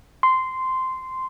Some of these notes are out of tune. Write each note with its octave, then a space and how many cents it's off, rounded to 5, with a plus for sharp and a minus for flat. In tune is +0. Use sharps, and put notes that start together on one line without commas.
C6 -10